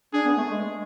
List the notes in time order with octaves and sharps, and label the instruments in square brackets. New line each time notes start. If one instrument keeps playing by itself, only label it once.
[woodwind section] D4 [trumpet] G#4
[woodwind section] B3
A3
G#3